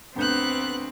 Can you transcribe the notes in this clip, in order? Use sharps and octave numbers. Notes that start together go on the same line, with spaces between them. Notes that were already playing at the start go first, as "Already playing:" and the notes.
G1 D2 B3 C4 F#6 G6